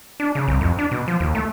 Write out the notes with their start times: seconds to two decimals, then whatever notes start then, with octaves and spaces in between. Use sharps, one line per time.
0.20 D4
0.35 C#3
0.48 C2
0.61 F2
0.79 D4
0.91 B2
1.08 F3
1.20 D#2
1.35 A3